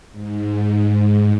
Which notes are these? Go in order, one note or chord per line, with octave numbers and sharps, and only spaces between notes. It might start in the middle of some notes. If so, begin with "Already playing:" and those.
G#2